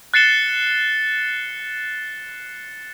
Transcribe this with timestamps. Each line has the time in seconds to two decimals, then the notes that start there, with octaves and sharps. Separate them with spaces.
0.14 F#6 A6 C7 C#7 E7 G7